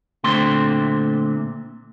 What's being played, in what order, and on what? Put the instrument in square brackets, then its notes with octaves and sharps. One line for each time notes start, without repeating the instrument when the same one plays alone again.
[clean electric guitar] A#2 D3 A3 C4 C6